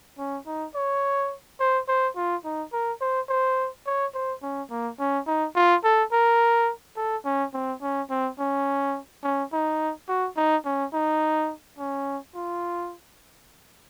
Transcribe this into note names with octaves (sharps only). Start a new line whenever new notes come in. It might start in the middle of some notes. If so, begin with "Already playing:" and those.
C#4
D#4
C#5
C5
C5
F4
D#4
A#4
C5
C5
C#5
C5
C#4
A#3
C#4
D#4
F4
A4
A#4
A4
C#4
C4
C#4
C4
C#4
C#4
D#4
F#4
D#4
C#4
D#4
C#4
F4